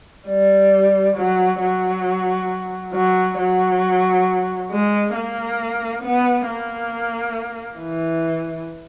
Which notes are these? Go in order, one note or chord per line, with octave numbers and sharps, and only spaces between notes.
G3
F#3
F#3
F#3
F#3
G#3
A#3
B3
A#3
E3